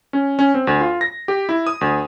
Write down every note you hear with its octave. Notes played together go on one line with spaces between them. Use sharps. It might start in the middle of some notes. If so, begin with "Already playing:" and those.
C#4
C#4
C4
D2
F4
A#6
G4
E4
D#6
D2